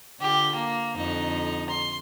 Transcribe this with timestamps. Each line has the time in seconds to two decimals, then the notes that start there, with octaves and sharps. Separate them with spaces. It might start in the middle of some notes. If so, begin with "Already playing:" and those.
0.21 D3 F4 G4
0.55 A#3
0.96 F2 D3 D#4
1.70 C6